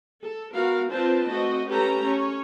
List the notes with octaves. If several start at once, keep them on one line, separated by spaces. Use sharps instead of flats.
A4
B3 F#4 A#4 F5
C4 D4 F4 B4 C5 A5
A3 C4 F#4 D#5
A3 C#4 G4 A4 B4 A#5
C#4 C#5